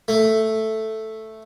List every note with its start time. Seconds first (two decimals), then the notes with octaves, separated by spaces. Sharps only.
0.08 A3